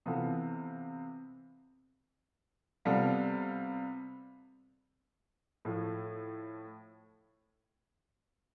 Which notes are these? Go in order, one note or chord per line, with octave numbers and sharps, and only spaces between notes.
C3 E3 B3 F4 A4
C3 G3 B3 F4 A4
A2 F3 A3